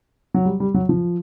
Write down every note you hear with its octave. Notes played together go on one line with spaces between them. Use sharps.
F#3
G3
G3
F#3
F3